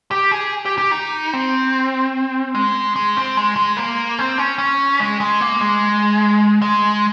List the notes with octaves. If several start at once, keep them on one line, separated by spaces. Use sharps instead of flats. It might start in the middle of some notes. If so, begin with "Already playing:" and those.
G4
G#4
G4
G4
D#4
C4
G#3
G#3
C4
G#3
G#3
A#3
C4
C#4
C#4
G#3
G#3
A#3
G#3
G#3